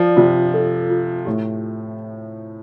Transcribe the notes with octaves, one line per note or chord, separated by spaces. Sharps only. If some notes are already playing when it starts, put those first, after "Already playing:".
Already playing: F3 D5
C3 F4
A4
F4
A2 G4